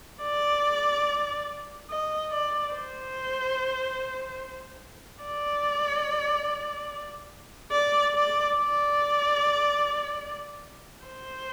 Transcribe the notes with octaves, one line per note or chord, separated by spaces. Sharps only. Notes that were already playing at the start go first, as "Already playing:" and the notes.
D5
D#5
D5
C5
D5
D5
D5
D5
C5